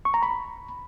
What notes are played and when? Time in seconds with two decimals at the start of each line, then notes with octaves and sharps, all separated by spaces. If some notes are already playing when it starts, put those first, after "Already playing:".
0.05 C#6
0.14 A#5
0.22 B5